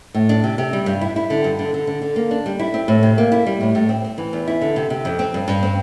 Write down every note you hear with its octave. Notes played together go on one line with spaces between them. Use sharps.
A2
D4
C3
C3
G3
G2
E4
E4
D3
G2
D3
D3
D3
D3
A#3
D4
G3
E4
C4
A2
C3
A#3
E4
G3
A2
A2
C4
C4
E3
E2
E4
D3
C3
C3
F2
C4
G2
G2
C4